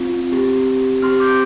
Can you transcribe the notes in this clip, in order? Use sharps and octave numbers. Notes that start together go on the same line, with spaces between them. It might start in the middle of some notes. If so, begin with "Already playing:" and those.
Already playing: C4 F4
C4 G4
C4 G4 C6 F6
D6 G6